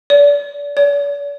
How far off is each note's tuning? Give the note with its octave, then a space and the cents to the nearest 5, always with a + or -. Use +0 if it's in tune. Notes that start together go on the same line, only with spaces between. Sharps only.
D5 -35
D5 -45